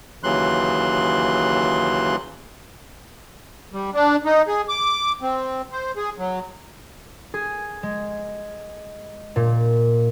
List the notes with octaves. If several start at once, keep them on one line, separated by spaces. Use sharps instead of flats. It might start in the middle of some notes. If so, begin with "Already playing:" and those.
D#2 C#3 E3 F#3 C6 F#6
G3
D4
D#4
G#4
D6
C4
C5
G#4
F#3
G#4
G#3
A#2